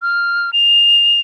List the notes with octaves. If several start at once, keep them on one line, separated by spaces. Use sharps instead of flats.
F6
F7